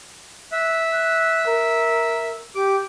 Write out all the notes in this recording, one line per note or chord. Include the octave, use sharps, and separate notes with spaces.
E5 F#6
F#6
A#4
G4 D6